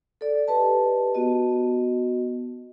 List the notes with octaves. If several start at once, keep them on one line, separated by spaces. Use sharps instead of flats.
A4 D5
G4 B4 D#5 A5
B3 F#4 D#5